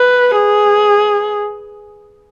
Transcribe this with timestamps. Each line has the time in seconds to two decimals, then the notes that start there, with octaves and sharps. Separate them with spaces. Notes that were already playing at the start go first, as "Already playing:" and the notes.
Already playing: B4
0.36 G#4